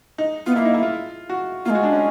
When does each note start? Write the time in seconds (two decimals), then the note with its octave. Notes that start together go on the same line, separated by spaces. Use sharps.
0.18 D#4
0.46 B3 F4
0.56 A#3 E4
0.65 D#4
0.74 E4
0.83 F4
1.30 F#4
1.65 A#3 F4
1.70 G#3 F#4
1.83 D4
1.92 C#4